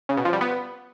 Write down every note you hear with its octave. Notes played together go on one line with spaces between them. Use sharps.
C#3
B2
F3
G3
B3